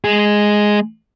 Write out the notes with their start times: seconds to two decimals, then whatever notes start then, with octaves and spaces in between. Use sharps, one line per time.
0.04 G#3 G#4